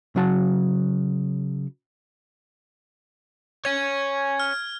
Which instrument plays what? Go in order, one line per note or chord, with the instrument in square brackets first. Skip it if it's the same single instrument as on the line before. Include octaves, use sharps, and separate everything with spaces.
[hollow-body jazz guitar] C#3 F#3 F#4 A5
[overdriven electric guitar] C#5 G#5 [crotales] G#6
[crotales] F6